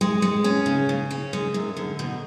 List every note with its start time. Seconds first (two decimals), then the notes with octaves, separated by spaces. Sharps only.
0.01 G#3
0.22 G#3
0.44 C#4
0.66 C#3
0.89 C#3
1.11 C#4
1.33 G#3
1.54 F#2
1.77 D3
1.99 B2